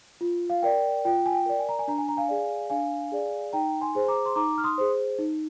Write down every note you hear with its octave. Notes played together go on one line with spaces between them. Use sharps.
F4
F5
A#4 D5 G5
F4 G5
G#5
G5
A#4 D5
G#5
A#5
G#5
D4 A#5
G#5
A#5
F5 G#5
G#4 D5
D4 F5 G#5
G#4 D5
D#4 G5 A#5
G#5 C6
G#4 C5
A#5 D6
C6
D#4 A#5 D6
F6
C6 D#6
G#4 C5
D#4